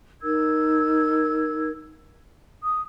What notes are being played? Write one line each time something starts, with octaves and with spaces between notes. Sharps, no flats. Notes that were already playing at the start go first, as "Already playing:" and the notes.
D#4 A#4 E6 G#6
D#6